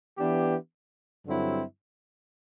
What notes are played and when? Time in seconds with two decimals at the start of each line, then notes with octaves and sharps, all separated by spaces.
0.18 E3 B3 D4 G4
1.25 G2 D3 F#3 C4 E4